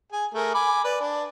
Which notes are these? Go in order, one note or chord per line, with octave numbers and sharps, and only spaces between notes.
G#4 G#5
A3 G#4 A#4
G#5 B5 D6
B4 D5
D4